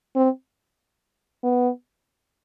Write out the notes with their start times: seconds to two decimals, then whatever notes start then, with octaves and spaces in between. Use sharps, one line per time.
0.16 C4
1.43 B3